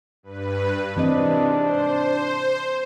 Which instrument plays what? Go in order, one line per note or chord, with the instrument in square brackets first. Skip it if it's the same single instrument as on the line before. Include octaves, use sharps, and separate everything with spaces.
[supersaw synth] G2 B4
[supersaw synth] G#2 C3 [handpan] E3 C4 D#5 [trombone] D4
[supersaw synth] C5